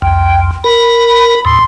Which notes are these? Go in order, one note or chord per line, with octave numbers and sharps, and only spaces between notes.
C2 F2 G5
A#4 B5
D#2 A2 C6